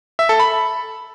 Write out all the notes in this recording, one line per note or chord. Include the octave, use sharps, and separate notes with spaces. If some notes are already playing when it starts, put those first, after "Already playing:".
E5
A4
B5